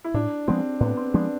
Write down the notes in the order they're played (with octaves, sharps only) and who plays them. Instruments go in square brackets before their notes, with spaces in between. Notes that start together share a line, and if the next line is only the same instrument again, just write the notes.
[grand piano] E4
[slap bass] A2 [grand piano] D4
[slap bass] F3 G#3 B3 [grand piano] C4
[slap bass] A2 [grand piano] B3
[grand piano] C4
[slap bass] F3 G#3 B3 [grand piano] D4